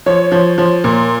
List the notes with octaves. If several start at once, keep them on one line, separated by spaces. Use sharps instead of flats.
F3 C#5
F3
F3
A#2